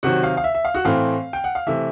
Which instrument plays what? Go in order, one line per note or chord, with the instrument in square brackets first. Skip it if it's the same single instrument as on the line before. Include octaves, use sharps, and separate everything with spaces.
[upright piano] C3 D#3 F#3 F#4 F#5
F5
F5
E5
E5
F5
F#4 F#5
A2 E3 A3 C4 F5
G5
F#5
F5
C3 E3 A3 E5